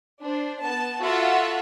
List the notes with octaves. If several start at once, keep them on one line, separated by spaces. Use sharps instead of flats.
D4 C5
B3 A5
F4 F#4 A4 E5 F#5